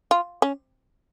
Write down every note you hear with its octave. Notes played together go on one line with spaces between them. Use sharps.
F4
C#4